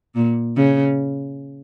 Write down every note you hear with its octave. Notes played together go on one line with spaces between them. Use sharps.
A#2
C#3